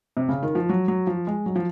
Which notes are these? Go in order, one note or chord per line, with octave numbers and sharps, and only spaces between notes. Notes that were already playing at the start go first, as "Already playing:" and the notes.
C3
C#3
D#3
F3
F#3
F#3
F3
G#3
F#3
F3